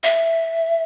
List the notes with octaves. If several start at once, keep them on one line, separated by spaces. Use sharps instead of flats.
E5